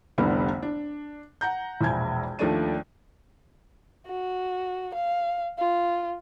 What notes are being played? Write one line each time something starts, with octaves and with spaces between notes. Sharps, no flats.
F1 C2 D3 G3 B3 C4
D4
F#5 A#5 G6
E1 A#1 E4 G#5 G#6
D#2 F3 A3 D4 D5 D#7
F#4
F5
F4